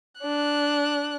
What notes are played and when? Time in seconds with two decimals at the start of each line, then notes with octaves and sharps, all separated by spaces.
0.21 D4 F#6